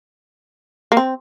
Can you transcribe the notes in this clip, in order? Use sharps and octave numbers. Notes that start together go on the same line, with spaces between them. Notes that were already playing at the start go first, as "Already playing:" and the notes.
A#3
C4